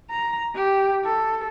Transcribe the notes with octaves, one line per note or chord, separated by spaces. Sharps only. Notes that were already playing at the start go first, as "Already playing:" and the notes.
A#5
G4
A4